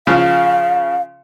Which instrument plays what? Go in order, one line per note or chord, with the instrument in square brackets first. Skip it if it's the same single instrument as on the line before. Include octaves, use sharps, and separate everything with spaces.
[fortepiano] C#3 F3 [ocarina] F5